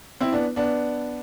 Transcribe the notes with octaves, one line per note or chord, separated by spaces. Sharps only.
C4 E4
B3 D4
B3 D4